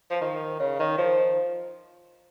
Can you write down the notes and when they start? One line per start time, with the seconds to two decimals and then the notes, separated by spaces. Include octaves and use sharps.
0.10 F3
0.21 D#3
0.60 C#3
0.79 D#3
0.98 F3